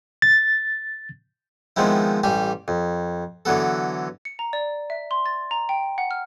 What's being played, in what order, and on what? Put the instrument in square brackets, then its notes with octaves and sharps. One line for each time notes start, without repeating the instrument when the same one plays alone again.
[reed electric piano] A6
[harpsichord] D#3 F3 G#3 B3 C4 E4
A1 G3 G4 G#5
F2
D3 E3 F#3 B3 A4
[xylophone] C#7
A#5
D5
E5
C6
A6
A#5
G5
F#5
F6